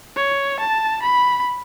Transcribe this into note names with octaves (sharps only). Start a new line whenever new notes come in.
C#5
A5
B5